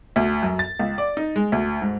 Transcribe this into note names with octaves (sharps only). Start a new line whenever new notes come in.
D2
F#2
A6
C#2
D5
D#4
G#3
D2
G#2